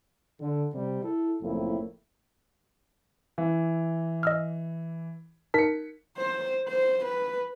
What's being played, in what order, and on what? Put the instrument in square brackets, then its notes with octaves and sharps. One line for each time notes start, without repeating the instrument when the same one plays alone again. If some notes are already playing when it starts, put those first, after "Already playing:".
[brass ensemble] D3
C3 G3
E4 A4
F#1 F2 A2 A#3 E4
[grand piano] E3
[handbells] D#5 E6 F6
[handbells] D#4 A#4 A5 [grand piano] B6 C#7
[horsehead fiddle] C5
C5
B4